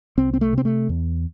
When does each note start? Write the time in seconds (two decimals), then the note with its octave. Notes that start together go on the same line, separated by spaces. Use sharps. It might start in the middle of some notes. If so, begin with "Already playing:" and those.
0.17 C2 C4
0.33 C4
0.41 A3
0.53 C3 C4
0.65 A3
0.89 E2